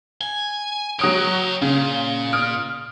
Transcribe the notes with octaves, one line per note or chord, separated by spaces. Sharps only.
G#5
F#3 G4 C#5 D#6 D7
A#2 C#3
D#6 F6 D7